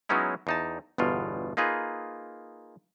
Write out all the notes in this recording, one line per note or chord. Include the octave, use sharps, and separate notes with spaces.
F#3 G#3 B3 C#4 D#4 E4
E2 D#4 A5
G1 E2 B2 F4
A#3 D#4 F4 G#4 B4